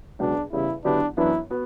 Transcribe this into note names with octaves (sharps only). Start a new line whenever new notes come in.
C#2 B2 F#3 D4
E2 C#3 G3 E4
D3 F#3 B3 D4 E4 G4
F#2 E3 B3 D4 E4
B3 F#4